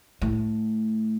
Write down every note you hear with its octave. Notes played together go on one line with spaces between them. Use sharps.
A2